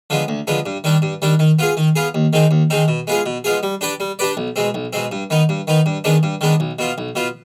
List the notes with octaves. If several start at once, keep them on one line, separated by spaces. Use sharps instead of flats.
D3 F3 G#3 B3
D2
D3 F3 G#3 B3
G2
D#3 G3 D4
G2
D#3 G3 D4
D#3
B3 F4 G#4
D#3
B3 F4 G#4
D#2
D#3 G#3 C4 D#4
D#2
D#3 G#3 C4 D#4
B2
G#3 B3 F4 G#4
B2
G#3 B3 F4 G#4
G3
D4 G4 B4 D5
G3
D4 G4 B4 D5
B1
B2 G#3 C4
B1
B2 G#3 C4
G2
D#3 B3 D#4
G2
D#3 B3 D#4
G2
D#3 G#3 B3 D4
G2
D#3 G#3 B3 D4
B1
B2 B3 F4
B1
B2 B3 F4